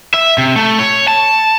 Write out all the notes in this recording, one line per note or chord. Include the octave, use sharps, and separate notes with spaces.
E5
C3
A3
C#5
A5